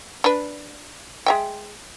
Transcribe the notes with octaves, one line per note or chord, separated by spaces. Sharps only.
D4 B4
G#3 E5 G5